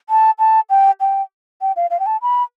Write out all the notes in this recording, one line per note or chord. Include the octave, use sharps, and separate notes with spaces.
A5
A5
G5
G5
G5
F5
F5
G5
A5
B5